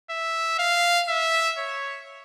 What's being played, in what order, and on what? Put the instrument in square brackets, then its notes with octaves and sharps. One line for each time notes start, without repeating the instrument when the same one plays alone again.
[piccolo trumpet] E5
F5
E5
C#5